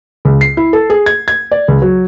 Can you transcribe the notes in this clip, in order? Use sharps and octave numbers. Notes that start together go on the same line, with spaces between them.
C#2
C7
E4
A4
G#4
G#6
G#6
D5
C#2
F#3